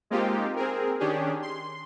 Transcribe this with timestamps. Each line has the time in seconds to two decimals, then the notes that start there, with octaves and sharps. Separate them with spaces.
0.10 G#3 A#3 C4 D#4 F4 G4
0.56 C4 G#4 A#4
1.00 D#3 C#4 D4 G4 G#4
1.42 C6